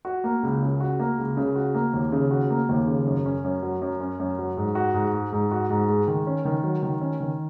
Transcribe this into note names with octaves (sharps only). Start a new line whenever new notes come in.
F#4
A#3
C#2
C#3
F#4
A#3
C#2
C#3
F#4
A#3
D#2
C#3
F#4
A#3
D#2
C#3
F#2
C#4
F#2
F#3
F#2
C#4
F#2
F#3
G#2
F#4
G#2
G#3
G#2
F#4
G#2
G#3
D#3
C#4
D#3
F#3
D#3
C#4
D#3